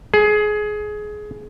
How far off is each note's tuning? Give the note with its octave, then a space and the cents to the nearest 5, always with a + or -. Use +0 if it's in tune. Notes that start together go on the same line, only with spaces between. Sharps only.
G#4 +20